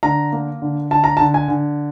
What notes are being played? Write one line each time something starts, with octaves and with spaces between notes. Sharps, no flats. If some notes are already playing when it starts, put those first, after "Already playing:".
D3 A#5
A#3
D3
D3 A5
A#5
A5
D3
G#5
D3